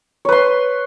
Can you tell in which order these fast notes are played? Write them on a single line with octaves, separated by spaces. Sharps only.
C#5 B4 C6